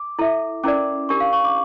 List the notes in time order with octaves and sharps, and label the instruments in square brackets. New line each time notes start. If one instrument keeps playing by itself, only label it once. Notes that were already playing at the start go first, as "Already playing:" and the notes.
Already playing: [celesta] D6
[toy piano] E4 A4 E5
[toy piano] C#4 E4 A#4 D5 [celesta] D6
[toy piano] D4 G4 A#4 [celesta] C#6
[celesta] F5
C#6
D6